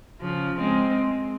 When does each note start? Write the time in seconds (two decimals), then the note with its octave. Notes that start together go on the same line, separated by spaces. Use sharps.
0.21 C#3 F3
0.59 G#3 C4